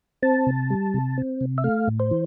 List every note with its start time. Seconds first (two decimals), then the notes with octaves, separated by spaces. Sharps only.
0.23 C4 A5
0.47 C3
0.70 G3
0.94 C3
1.18 C4
1.41 C3
1.58 E5
1.64 A3 F5
1.88 A2
2.00 C5
2.11 E3